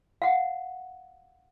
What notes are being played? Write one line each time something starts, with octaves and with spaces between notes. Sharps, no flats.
F5 F#5